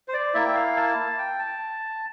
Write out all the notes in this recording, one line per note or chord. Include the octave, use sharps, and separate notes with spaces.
C5
D5
A#3 E4 E5
G5
F5
A5
G5
A5